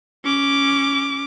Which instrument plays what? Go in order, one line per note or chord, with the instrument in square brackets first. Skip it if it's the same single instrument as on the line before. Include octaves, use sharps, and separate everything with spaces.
[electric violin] C#4 D6